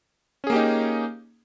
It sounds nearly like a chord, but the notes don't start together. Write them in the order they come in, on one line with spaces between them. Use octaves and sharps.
C#4 G#4 A#3 G4 D#4